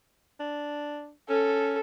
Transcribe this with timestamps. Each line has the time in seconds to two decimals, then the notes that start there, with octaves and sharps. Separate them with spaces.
0.40 D4
1.30 C#4 A4